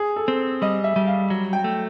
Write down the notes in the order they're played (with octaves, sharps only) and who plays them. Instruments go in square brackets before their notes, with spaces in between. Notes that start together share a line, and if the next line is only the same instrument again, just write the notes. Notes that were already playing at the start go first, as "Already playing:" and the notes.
Already playing: [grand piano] G#4
A4
[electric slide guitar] C4
[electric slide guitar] G3 [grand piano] D#5
[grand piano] E5
[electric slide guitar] G3
[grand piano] F5
[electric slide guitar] F#3
[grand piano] G5
[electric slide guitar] A3